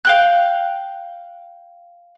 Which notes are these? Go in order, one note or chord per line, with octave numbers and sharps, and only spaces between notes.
F5 G5 F#6